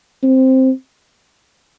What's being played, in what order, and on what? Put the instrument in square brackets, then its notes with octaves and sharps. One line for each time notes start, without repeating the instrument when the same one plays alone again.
[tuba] C4